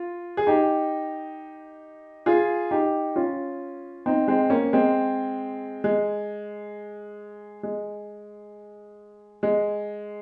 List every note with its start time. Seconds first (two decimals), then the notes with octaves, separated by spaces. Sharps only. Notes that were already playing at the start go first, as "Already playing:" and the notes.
Already playing: F4
0.37 G#4
0.47 D#4 G4
2.26 F4 G#4
2.71 D#4 G4
3.16 C#4 F4
4.06 C4 D#4
4.28 G#3 C4
4.50 A#3 C#4
4.73 G#3 C4
5.84 G#3
7.63 G#3
9.43 G#3